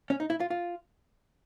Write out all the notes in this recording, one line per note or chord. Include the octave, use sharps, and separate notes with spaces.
C#4
D#4
E4
F4
F4